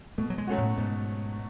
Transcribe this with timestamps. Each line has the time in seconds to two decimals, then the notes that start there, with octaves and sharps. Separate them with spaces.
0.18 B2 A3
0.30 F#3
0.38 G#3
0.47 F#3 A3 C#4 F#4
0.58 A2
0.77 G#2 B2